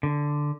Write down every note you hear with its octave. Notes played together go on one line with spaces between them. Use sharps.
D3